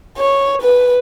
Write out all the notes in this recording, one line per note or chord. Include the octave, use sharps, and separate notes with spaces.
C#5
B4